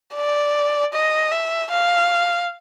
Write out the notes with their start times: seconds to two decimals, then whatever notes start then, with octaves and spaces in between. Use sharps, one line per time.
0.15 D5
0.93 D#5
1.31 E5
1.71 F5